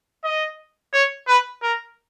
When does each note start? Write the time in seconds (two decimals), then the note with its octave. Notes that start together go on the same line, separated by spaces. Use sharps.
0.24 D#5
0.93 C#5
1.27 B4
1.62 A#4